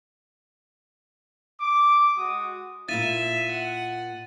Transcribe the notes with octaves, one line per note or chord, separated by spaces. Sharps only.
D6
G#3 F#4 D#6
A#2 E4 F4 E5 A6 D#7
F#5